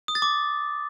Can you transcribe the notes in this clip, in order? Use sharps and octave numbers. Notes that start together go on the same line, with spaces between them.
D#6
A6
D6